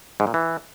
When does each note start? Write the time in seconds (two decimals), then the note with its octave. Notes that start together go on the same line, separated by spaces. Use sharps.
0.20 G#2
0.27 A#2
0.34 E3